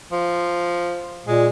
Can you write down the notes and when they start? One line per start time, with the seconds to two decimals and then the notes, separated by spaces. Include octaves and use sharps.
0.12 F3
1.26 A#2 G#3